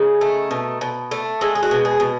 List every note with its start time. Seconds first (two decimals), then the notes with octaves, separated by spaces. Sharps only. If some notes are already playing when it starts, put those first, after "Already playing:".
Already playing: C#3 D#4
0.21 A3
0.51 B2
0.81 B2
1.11 A3
1.41 G#3 E4
1.55 G#4
1.63 F#4
1.71 B2
1.85 G#4
2.00 B2